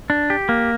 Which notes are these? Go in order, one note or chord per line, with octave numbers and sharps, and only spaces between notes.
D4
G4
A#3